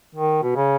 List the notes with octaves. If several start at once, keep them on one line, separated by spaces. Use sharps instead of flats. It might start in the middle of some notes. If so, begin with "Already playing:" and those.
D#3
B2
C#3